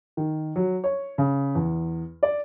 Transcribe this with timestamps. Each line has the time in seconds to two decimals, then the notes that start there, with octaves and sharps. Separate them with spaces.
0.17 D#3
0.56 F#3
0.84 C#5
1.18 C#3
1.55 E2
2.23 D5